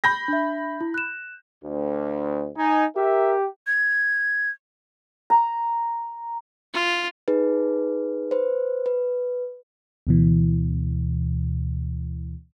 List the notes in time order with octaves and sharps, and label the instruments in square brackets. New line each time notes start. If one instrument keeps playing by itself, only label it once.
[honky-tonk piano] B5 G6 A#6
[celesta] D4 E5
E4
F#6 E7
[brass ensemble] D2
D#4 G#5
[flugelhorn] G4 [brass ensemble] A#4 E5
[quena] G#6
[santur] A#5
[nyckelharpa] F4
[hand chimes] D#4 G#4 B4
B4 C5
B4
[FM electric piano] D2 B2 E3